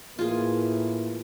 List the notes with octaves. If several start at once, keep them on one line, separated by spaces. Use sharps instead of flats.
A2 E3 A#3 F4 G#4